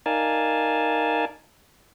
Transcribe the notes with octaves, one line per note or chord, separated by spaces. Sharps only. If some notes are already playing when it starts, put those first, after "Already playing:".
D#4 A#4 D5 F5 G#5 A5